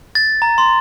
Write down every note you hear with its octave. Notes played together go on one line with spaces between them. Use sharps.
A6
A#5
C6